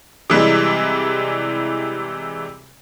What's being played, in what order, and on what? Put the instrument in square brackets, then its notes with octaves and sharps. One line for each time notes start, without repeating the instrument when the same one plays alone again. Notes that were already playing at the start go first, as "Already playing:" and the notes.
[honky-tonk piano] C3 E3 G3 G#3